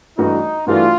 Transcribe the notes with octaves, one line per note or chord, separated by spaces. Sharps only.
G2 E3 A3 D4 D#4 F#4
G2 E3 A3 D4 F4 F#4